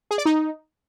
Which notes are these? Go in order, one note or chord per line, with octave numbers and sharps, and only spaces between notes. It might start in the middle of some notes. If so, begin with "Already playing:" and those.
G#4
D5
D#4